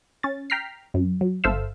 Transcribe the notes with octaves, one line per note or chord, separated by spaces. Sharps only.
C#4 A6
G5 A#5 F6 B6 C7
F#2
F#3
G1 A4 C5 E5 F5 E6